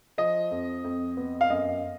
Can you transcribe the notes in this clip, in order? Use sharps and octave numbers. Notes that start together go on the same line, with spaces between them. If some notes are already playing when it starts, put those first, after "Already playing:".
F3 D#5
F2
F2
B3
F5
F#2 D#5